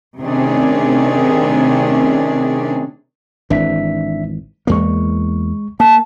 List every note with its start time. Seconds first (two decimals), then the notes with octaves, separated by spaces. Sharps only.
0.20 C3 D#3 A3 C#4 D4 G#4
3.50 G#1 E3 D4 E5 B6
4.67 E2 G#3 A#3 C#6
5.80 A#3 A5